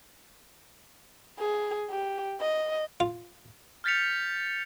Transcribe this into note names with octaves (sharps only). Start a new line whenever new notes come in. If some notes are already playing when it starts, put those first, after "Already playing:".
G#4
G4
D#5
F4
F6 G6 A6 B6 C#7 F7